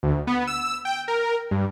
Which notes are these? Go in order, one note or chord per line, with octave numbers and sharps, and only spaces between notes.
D2
B3
E6
G5
A#4
G2